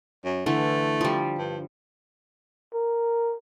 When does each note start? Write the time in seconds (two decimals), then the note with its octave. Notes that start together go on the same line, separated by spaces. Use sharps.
0.24 F#2
0.46 D3 E3 A3
1.01 F3 G3
1.38 G2
2.74 A#4